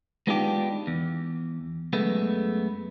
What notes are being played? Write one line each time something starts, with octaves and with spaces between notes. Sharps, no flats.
G#3 B3 D4 D#4 F4 G4
E2
F#2 G#3 A3 B3